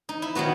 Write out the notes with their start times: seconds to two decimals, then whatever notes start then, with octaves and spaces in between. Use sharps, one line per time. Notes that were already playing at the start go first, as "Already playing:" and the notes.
0.09 D#4
0.22 E4
0.35 D#3 F#3 B3 F#4